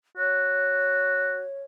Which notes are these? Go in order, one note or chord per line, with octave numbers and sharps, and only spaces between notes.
F#4 C#5